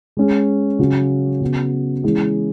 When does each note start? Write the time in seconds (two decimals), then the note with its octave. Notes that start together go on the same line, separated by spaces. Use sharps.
0.17 G#3 C#4 G#4
0.79 C#3 F#3 C#4
1.41 C#3 F#3 B3
2.03 E3 G#3 C#4 E4 G#4